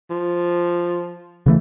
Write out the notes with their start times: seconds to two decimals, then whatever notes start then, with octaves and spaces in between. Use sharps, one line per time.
0.10 F3
1.46 C#3 E3 A3